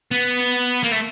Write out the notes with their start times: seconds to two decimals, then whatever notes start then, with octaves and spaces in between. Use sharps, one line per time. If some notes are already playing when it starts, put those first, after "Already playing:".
0.11 B3
0.84 A#3
0.92 A3